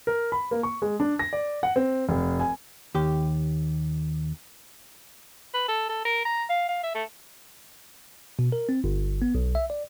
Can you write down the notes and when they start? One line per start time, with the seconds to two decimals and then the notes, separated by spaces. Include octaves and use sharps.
0.07 A#4
0.32 B5
0.51 A#3
0.63 C#6
0.82 G#3
1.00 D4
1.19 A#6
1.33 D5
1.63 F#5
1.76 C4
2.09 F1
2.40 G#5
2.95 D#2 G4
5.54 B4
5.68 A4
5.89 A4
6.05 A#4
6.25 A#5
6.49 F5
6.69 F5
6.83 E5
6.95 A3
8.39 B2
8.52 A#4
8.69 C4
8.84 G1
9.22 B3
9.35 B1
9.55 E5
9.70 D5